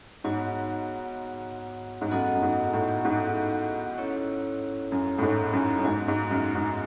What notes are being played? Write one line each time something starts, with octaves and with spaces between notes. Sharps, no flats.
G#2 B3 F#4 C#5 F#5
G#2
F#2 B3 F#4 A4 D#5 F#5
F#2
G#2
A2
G#2
C#4 E4 A4 C#5
F#2
A2
G#2
F#2
F#2
G#2 G#3 B3 F#4
G#2
F#2
G#2